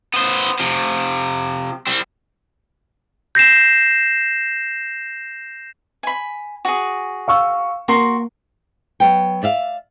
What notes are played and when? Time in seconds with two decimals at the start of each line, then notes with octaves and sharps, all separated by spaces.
0.14 B3 C5
0.60 C3 F3
1.87 G3 C4
3.35 G6 A#6 C7 E7
6.03 G#5 B5
6.65 F#4 G#4
7.28 F5 C#6 E6
7.88 A#3 F#4 A#4 C6
9.00 F#3 B3 G5
9.43 D5 E5 F5